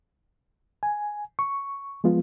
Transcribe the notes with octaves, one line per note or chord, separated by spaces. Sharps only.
G#5
C#6
F3 G#3 B3 F4